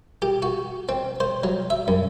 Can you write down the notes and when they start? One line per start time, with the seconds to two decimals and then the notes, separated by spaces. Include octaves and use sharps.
0.22 G4
0.42 F#4
0.89 C4
1.20 C5
1.44 F#3
1.70 E5
1.88 F#2